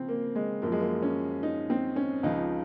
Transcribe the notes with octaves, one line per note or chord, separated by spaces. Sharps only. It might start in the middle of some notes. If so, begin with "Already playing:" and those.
Already playing: C#3 F3 C4
A#3
G#3
F#2 F3 A#3
G#3
A#3
C#4
D#4
C4
C#4
C#2 C#3 F3 D#4